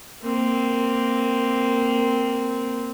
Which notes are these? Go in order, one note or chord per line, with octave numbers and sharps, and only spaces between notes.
A#3 C4